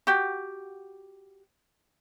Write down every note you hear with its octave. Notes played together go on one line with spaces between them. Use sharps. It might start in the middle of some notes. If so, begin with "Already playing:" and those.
F#4 G4